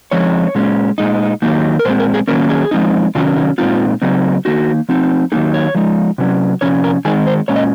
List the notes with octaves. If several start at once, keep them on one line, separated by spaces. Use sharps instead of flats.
F3 G#3 C4 D#4 C#5
A#2 G#3 C#4
A#2 G#3 D#4
D#3 F#3 A#3 D#4
A#4
A#2 G#3 C4 C5
A#4
G#4
D#3 F#3 A#3 C#4 A#4
G#4
F3 G#3 C4 D#4
C3 D#3 F#3 C#4 F4
D#4
A#2 G#3 C4 D#4 F4
C#3 F#3 C4 D#4
D#3 A#3 D#4 F#4
F3 C4 D#4
D#3 F#3 A#3 D#4 G#4
C#5
F3 G#3 D#4
C3 F#3 C#4
C3 F3 C#4 C#5
A#4
D#3 G#3 C4 D#4 G#4
C5
A#2 G#3 C#4 C#5
D#5